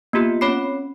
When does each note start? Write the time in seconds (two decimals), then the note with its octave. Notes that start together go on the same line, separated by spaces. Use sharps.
0.13 A#3 B3 F4 G4
0.41 C4 C#4 C#5 B5 D6 C7